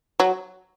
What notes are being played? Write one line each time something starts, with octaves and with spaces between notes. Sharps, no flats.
F#3